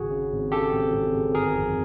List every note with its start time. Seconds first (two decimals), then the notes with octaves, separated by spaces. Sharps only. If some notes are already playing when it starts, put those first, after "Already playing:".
Already playing: G#1 C#3 F#4 G#4
0.11 C#3
0.32 G#1
0.52 C#3 G4 A4
0.73 G#1
0.93 G#1
1.14 G#1
1.35 G1 G#4 A#4
1.56 F2